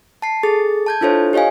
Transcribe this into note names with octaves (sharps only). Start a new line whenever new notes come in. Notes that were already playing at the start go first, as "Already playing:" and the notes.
A5 C7
G#4 A4 A6
A5 G6 G#6
D4 E4 F4 A4 C5 C#5
G4 C#5 D#5 F5 G#5